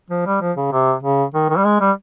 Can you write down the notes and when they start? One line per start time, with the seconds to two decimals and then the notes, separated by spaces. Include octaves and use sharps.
0.10 F3
0.26 G3
0.41 F3
0.57 C#3
0.72 C3
1.03 C#3
1.34 D#3
1.50 D#3
1.57 G3
1.65 G#3
1.81 G3